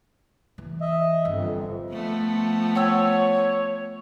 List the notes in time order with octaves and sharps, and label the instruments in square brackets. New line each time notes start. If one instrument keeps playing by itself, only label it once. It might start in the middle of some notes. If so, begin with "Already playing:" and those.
[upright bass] E3
[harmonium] D#5 E5
[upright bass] G1 [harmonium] F2
[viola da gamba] F3 A3 B3
[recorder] C#5 [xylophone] F#5 G5 E6